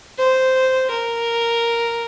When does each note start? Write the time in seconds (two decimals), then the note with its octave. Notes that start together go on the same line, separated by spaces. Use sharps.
0.18 C5
0.91 A#4